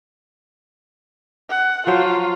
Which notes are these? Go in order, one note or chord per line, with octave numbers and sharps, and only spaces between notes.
F#5
F3 F#3 F4 C5